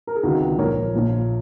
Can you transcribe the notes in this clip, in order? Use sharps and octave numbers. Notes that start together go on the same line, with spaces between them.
A#4
G#4
C#2 C3 D#3 D#4 F#4
A#1 A#2 F3 A#4 C#5
A#1 A#2 F3